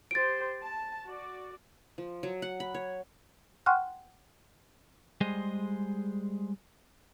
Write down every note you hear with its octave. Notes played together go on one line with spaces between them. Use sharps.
G4 C5 A6 D7
A5
F#4 D5
F3
F#3
F#5
B5
C#5
F#5 G5 C6 C#6 F6 F#6
G3 G#3 G#4 C5 D#5